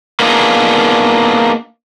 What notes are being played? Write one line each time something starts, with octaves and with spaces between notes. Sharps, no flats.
A#3 B3 D4 D#4 F4 G#4